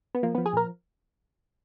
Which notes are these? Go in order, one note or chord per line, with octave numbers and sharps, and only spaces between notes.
B3
F3 A#3
F3 B3
G#4
A#2 A#4